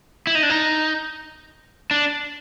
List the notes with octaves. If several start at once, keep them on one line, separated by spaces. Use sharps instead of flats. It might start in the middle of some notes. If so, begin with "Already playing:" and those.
E4
D#4
D4
D#4
D4